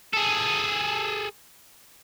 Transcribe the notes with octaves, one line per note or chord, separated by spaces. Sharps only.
G#4 A4